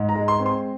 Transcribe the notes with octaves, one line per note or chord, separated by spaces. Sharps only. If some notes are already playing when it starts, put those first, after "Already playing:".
Already playing: G#2
A#5
G#3
C6
C4
C6